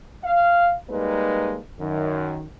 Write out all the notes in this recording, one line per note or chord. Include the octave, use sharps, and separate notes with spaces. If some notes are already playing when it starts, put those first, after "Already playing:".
F5
G3 G#3 A#3 D#4 B4
F#2 D#3